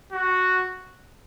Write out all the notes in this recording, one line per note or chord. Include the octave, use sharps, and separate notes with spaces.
F#4